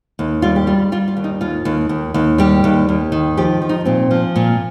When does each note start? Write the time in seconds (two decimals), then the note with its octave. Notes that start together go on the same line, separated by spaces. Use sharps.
0.19 D#2
0.42 G3 F4
0.56 G4
0.67 G3 F4
0.92 G3 F4
1.08 F4
1.17 D#2
1.24 D#4
1.41 D#2 F4
1.65 D#2
1.89 D#2
2.14 D#2
2.38 G3 G4
2.64 D#2
2.89 D#2
3.12 D#3
3.37 F3 G4
3.62 F3
3.69 D#4
3.85 A#2 C4
4.11 F3
4.36 A#2